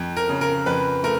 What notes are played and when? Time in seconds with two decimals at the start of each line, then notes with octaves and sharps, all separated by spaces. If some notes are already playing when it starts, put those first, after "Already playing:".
Already playing: F2
0.17 A#4
0.29 C#3
0.41 A#4
0.66 F2 B4
1.03 A3 A#4